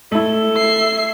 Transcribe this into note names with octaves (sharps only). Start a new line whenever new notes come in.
A3 E4 A4
E5 C7